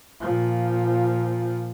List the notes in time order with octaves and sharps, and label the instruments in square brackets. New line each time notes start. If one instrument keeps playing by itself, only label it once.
[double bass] A#2 F3